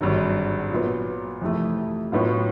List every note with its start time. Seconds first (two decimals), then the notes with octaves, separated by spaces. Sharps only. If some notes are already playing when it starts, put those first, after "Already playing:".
0.01 G#1 G2 D3 F#3
0.70 A#2 F#3 B3
1.41 F2 C3 E3 A3
2.12 A2 F#3 B3 D4 F4